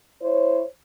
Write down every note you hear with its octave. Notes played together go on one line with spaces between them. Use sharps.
E4 C5 C#5